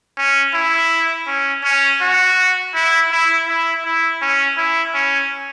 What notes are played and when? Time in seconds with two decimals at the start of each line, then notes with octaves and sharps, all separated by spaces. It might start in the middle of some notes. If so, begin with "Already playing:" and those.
0.18 C#4
0.54 E4
1.27 C#4
1.64 C#4
2.02 F#4
2.75 E4
3.12 E4
3.48 E4
3.85 E4
4.22 C#4
4.57 E4
4.94 C#4